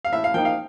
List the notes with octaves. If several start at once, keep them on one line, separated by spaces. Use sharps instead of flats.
F5
A2 E5
F5
F3 A#3 D#4 G5
F5